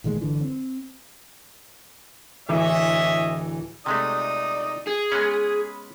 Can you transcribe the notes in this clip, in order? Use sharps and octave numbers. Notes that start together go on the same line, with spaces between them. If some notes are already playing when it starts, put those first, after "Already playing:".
A1 A#2 D#3 G#3
G1 D3 E3
C4
D1 E3 C#5 D#5 E5 D6
C3 G#3 A3 D#4 D5 D#6
G#4
G#3 B3 C#4 B5